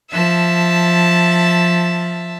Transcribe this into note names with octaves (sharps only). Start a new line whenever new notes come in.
F3 E5 A5